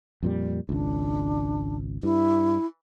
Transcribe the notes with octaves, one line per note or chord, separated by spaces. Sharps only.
F2 A#2 G3
G#1 C#2 D4
G2 E4